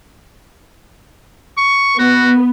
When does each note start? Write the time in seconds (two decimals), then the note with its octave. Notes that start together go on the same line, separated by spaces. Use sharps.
1.57 C#6
1.99 B3 F#4